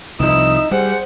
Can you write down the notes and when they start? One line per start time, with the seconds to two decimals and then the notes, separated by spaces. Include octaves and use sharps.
0.20 C2 F3 D#4 E4 D#6 E6
0.71 G3 G#4 C5 F#5